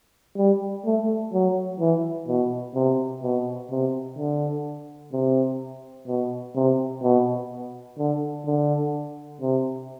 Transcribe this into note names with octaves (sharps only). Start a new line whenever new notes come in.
G3
A3
F#3
E3
B2
C3
B2
C3
D3
C3
B2
C3
B2
D3
D3
C3